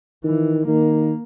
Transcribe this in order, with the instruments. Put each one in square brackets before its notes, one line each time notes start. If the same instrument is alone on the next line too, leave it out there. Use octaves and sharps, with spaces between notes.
[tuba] D#3 [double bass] E3
[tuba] D#3 [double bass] A#3